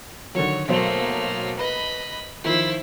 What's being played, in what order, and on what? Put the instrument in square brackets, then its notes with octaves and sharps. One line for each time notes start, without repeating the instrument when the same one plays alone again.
[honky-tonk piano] D3 D#3 F#3 [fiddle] C#5
[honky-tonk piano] B1 F#3 C5 [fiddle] A3 A#3
[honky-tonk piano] B4 [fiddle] D#5 B5
[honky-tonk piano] D#3 F3 [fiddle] E4 C5